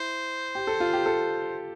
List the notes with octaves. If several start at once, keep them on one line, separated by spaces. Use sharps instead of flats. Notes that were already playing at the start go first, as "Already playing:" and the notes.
Already playing: E4 C5
G4
A4
F4
G4
A4